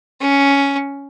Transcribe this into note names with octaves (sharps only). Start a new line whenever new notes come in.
C#4